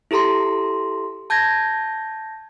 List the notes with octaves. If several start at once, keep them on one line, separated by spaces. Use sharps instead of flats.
E4 G4 A4 A#5 C6
A5 G6 G#6 A#6